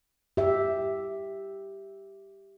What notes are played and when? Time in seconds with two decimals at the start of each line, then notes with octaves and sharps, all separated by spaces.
0.37 G4 E5